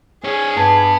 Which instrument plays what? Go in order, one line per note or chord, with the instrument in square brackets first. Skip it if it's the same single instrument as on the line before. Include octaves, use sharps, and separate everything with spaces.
[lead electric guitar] D4 C#5 [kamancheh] G#4
[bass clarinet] G2 [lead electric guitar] B3 B4 [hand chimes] A5